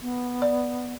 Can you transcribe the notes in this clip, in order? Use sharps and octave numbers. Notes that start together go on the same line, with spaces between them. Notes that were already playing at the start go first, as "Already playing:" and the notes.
B3
D5